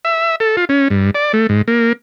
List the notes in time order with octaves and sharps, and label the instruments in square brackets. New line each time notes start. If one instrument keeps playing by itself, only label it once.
[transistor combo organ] E5
A4
F4
C#4
G2
D5
A3
G#2
A#3